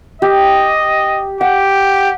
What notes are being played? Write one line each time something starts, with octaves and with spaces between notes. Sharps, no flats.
G4 D#5
G4 F#5